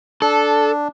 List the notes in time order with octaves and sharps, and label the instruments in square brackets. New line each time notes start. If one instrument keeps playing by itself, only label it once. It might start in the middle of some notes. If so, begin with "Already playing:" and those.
[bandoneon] D4 [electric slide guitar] A4